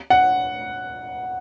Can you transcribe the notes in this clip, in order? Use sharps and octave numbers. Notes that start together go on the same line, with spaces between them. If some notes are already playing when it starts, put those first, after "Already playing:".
F#5